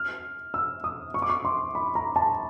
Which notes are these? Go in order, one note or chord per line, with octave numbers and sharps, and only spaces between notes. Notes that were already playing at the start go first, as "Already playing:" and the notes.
Already playing: F6
E6
D#6
C#6
D6
C#6
C6
B5
A#5
A5